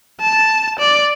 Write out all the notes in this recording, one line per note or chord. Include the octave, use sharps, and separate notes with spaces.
A5
D5